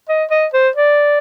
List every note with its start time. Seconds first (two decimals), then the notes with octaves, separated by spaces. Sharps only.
0.09 D#5
0.31 D#5
0.53 C5
0.76 D5